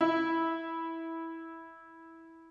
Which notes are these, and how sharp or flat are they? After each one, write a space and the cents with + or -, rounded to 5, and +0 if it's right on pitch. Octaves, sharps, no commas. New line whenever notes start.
E4 -10